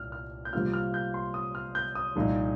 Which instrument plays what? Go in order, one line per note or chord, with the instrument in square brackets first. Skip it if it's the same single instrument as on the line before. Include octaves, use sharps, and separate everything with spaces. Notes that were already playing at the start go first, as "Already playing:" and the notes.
Already playing: [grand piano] C2 A#2 F6
F6
G6
C3 G3 A#3 F4 F6
F6
G6
C6
D#6
F6
G6
D#6
C2 A#2 F3 D#4